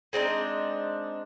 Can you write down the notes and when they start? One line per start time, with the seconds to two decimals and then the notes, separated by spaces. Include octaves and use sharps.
0.13 G#3 C4 D4 D#4